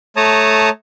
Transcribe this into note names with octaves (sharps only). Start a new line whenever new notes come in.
A3 C#5 A5 A#5 D#6